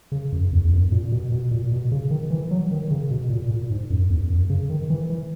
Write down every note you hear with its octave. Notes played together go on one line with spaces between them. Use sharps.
C#3
F#2
E2
E2
F#2
A#2
B2
B2
A#2
B2
C#3
D#3
E3
F#3
D#3
C#3
B2
A#2
A#2
G#2
F#2
E2
F#2
C#3
D#3
E3
E3